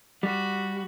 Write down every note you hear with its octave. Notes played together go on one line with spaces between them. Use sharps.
G3 F#4